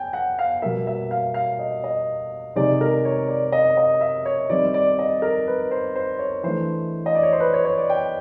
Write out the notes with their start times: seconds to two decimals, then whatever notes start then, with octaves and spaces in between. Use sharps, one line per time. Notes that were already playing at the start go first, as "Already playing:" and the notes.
Already playing: G5 G#5
0.13 F#5
0.39 F5
0.62 B2 G3 A#3 E5
0.87 E5
1.11 F5
1.34 F5
1.59 D#5
1.84 D#5
2.56 C3 D#3 G#3 C4 D#4 D5
2.81 A#4
3.05 C#5
3.28 D5
3.52 D#5
3.77 D#5
4.01 E5
4.26 C#5
4.50 D#3 G3 C4 D#4 D5
4.74 D5
4.99 D#5
5.22 A#4
5.47 B4
5.71 C5
5.96 C5
6.19 C#5
6.43 E3 A3 D4 C5
7.06 D#5
7.15 D5
7.23 C#5
7.33 C5
7.40 B4
7.53 C#5
7.65 C#5
7.78 D5
7.90 G5